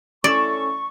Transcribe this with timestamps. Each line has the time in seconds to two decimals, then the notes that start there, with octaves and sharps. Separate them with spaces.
0.24 C#4 E4 A4 D5 C#6